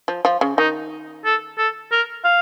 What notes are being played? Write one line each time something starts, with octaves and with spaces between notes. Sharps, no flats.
F3
F3
C#3
D#3 D#4
A4
A4
A#4
F5